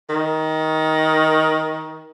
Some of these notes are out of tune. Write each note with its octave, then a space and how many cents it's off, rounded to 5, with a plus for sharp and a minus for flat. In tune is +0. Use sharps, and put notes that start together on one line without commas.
D#3 +15